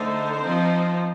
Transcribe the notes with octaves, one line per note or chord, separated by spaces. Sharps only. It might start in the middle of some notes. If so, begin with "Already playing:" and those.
Already playing: D3 A3 D#4 C5
F3 C4 D#4